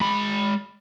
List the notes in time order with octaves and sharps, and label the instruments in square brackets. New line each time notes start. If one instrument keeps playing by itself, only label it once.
[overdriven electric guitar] G#3 B5